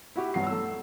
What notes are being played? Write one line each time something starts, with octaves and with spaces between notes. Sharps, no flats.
E4 F#4 G4
G2 F#3 B3 C7
A3 E6